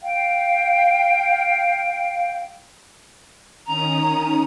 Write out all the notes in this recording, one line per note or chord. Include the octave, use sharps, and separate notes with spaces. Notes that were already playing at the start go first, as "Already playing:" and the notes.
F5 G5
D#3 C#4 A#5 D#6